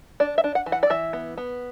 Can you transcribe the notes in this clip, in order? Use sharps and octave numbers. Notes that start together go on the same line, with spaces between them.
D4 D5
E5
D4
F#5
E3
F#5
D5
E3 E5
B3
B3